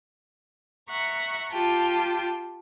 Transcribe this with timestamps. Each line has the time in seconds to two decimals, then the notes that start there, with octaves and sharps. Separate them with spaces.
0.89 E5 F#5 A#5 C#6
1.51 F4 G4 G5 A5